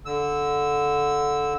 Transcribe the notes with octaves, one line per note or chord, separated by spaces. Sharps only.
D3 E6